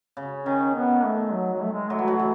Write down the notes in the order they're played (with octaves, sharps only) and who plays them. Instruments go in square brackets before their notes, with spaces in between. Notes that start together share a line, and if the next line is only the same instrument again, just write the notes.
[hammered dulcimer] C#3
[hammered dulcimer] D#3 [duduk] C#4
[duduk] B3
A3
F#3
F#3
A3
G#3
[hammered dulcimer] F#3 [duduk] A3
[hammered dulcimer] E3
F#3
E3